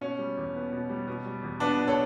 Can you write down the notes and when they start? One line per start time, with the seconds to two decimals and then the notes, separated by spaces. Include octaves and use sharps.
0.01 B2 C#4
0.19 G3
0.37 E2
0.55 B3
0.73 B2
0.89 G3
1.07 B2
1.26 G3
1.42 E2
1.60 B3 D4
1.79 B2
1.87 A4 C#5